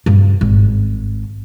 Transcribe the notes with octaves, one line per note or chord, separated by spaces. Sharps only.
G2 C#3
G#1